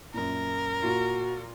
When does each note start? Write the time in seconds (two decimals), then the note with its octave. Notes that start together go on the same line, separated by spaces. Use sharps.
0.14 F#2 A#2 A#4
0.82 A#2 F4 F#4